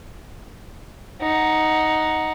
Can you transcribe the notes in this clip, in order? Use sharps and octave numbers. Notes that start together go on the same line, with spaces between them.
D#4 F#5